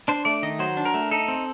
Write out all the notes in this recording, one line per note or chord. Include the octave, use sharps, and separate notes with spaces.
D4 C5
A3 D5
D#3 D#5
F#3 C5
D4
A#4
A3
D#4 A4
C4